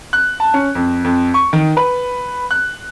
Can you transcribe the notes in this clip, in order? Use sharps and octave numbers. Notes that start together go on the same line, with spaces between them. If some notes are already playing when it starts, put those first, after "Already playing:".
F#6
A5
C#4
F2
F2
C#6
D#3
B4
F#6